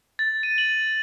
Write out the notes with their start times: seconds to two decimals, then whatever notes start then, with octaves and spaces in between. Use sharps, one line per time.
0.19 A6
0.43 D#7
0.58 F#7